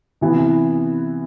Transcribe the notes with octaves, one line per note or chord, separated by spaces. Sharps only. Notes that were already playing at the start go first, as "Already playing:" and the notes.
C3 E3 B3